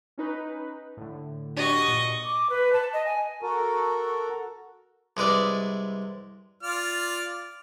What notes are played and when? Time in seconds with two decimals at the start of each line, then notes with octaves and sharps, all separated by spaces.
0.18 C#4 D#4 B4
0.97 A2 D3
1.57 D4 F#4 G4 D#5 C#6
1.88 A#2
2.23 D6
2.50 B4
2.73 A5
2.93 D#5
3.06 G#5
3.43 F#4 A4 A#4
5.17 C2 G#3 B4 D5 E5
6.63 F4 D5 F6